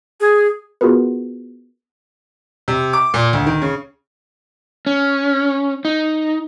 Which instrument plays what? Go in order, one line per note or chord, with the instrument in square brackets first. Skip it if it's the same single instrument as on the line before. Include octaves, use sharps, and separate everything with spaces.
[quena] G#4
[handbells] B3 F4 F#4 G#4 A#4 B4
[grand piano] C3
D6
A#2
D2
D#3
C#3
[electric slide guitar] C#4
D#4